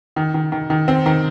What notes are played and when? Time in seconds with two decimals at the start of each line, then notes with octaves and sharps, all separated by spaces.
0.16 D#3
0.34 D#3
0.52 D#3
0.70 D#3
0.88 C4
1.06 D#3